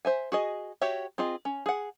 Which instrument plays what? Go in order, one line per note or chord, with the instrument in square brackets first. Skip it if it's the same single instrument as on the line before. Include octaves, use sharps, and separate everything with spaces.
[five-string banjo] C5 E5 G#5
F#4 G#4 D#5
F#4 G4 C#5 E5
C4 F4 G#4 D#5
C#4
G#4 F#5